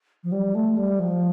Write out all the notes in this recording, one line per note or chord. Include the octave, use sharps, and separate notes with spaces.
F3
G3
A3
G3
F3